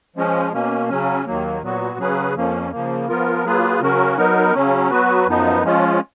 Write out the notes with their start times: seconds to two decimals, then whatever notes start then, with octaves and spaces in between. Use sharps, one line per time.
0.16 F3 G#3 C#4
0.53 B2 A#3 C#4
0.89 C#3 F#3 C#4
1.26 D#2 D#3 F#3 A#3
1.62 A#2 F#3 B3 F#4
1.99 C#3 F#3 C#4 G#4 B4
2.35 F2 F3 A#3 C#4
2.71 C#3 F3 A#3
3.08 F3 B3 F4 A#4
3.44 F#3 A#3 F4 G#4 B4
3.81 C#3 F#3 C#4 F#4 A#4
4.17 F#3 B3 D#4 A#4
4.54 C#3 F#3 C#4
4.91 F#3 B3 F#4 B4
5.26 F#2 F3 B3 D#4
5.63 F3 G#3 C#4 F4